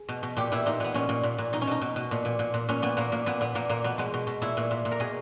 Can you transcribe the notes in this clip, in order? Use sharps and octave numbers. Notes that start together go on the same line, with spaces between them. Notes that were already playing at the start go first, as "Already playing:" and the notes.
Already playing: G#4
B2
B2
A#2 G4
A#2 E4
A#2 D#4
A#2 B3
A#2 C#4
A#2
A#2
A#2
B2 D#4
C#4
B2 D#4
B2
B2
A#2
A#2
A#2
A#2
A#2 C#4
A#2 B3
A#2 A#3
A#2 A#3
A#2 B3
A#2 B3
A#2 A#3
A#2 A#3
B2 B3
B2 G#3
B2
B2
A#2 E4
A#2
A#2
A#2
A#4
B2 G#4